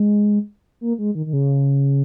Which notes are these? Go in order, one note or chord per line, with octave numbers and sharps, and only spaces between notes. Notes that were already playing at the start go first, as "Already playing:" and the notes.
Already playing: G#3
A#3
G#3
D#3
D#3
C#3